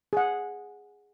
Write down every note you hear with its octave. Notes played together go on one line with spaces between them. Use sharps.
G#4 F#5